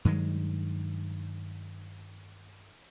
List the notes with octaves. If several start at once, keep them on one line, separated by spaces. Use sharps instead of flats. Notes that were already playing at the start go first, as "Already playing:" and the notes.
G2 D#3 F#3 G#3